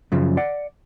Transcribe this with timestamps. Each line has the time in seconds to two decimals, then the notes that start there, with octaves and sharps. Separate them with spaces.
0.12 F#2 C#3 F3
0.37 D5 F#5